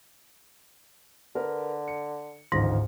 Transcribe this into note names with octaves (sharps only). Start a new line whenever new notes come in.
D3 A#4 B4
C#7
A1 D2 G#2 D#3 F3 A#6